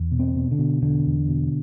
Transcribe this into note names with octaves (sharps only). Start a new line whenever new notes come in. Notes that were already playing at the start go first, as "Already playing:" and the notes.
Already playing: E2
B2
C4
B2
D3
B2
E2 D3
E2
B2